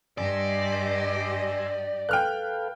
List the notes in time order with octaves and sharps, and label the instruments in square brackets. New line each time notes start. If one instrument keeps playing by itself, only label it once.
[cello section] G2 G4 D#5 [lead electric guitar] D5 [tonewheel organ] G#5 C6 E6
[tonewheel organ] A4 B4 F5 [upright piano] G5 F6 F#6